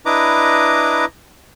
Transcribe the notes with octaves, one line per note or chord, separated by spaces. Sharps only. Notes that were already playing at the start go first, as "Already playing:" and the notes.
D4 E4 B4 D#5 A#5 D6